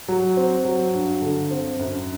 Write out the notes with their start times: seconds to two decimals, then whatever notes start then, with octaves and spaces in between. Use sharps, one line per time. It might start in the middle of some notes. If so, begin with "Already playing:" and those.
0.08 F#3
0.37 C4
0.65 F#3
0.93 G2
1.22 D3
1.51 C4
1.79 F#2